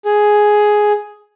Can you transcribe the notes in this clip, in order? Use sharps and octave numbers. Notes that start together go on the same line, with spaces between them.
G#4